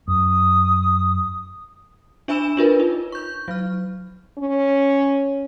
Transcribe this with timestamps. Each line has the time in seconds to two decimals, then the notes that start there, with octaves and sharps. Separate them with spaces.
0.08 F#2 D#6
2.28 D4 E5 G#5 B5 E6 E7
2.57 D4 F4 A#4 B4
2.79 D#4 F4
3.12 C#6 G6
3.48 F#3 F6
4.39 C#4